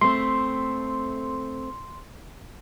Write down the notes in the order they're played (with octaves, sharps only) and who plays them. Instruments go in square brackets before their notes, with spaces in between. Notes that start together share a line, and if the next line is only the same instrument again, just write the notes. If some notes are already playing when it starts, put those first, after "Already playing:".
[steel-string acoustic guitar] A3 C4 [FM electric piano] C6